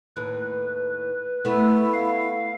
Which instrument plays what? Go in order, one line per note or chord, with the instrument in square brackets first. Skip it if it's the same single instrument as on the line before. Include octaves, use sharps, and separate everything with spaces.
[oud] D#2 A2 [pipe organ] B4
[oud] A3 B3 [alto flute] E4
[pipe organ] F5